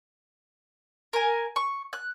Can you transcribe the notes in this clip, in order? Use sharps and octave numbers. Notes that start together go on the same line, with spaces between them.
A#4 G#5
C#6
F#6